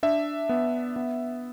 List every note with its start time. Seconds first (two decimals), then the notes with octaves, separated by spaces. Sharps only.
0.03 D4 E5
0.49 B3
0.96 B3